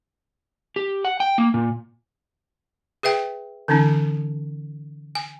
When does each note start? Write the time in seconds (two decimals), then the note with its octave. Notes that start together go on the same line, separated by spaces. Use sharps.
0.76 G4
1.05 F#5
1.20 G5
1.38 A#3
1.54 A#2
3.03 G#4 B4 E5 G5
3.68 D3 E3 C#4 D#4
5.15 G#5